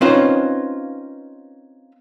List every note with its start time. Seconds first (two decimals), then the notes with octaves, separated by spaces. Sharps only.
0.01 C4 C#4 D#4 F4 B4 C5